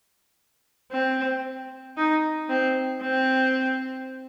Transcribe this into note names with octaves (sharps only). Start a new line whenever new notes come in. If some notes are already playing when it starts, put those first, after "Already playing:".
C4
D#4
C4
C4